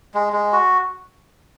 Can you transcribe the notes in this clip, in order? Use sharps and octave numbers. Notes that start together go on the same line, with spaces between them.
G#3
G#3
F#4